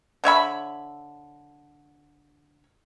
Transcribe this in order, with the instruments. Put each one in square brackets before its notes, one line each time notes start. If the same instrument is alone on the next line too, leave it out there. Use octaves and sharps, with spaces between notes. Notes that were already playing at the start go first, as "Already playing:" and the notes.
[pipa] D3 C#5 E5 B5